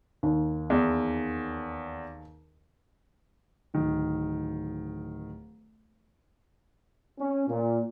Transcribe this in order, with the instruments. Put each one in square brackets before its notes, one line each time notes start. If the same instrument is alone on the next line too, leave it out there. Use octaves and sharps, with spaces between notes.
[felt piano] D#2
[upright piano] E2
[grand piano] D1 D#3
[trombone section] C#4
A#2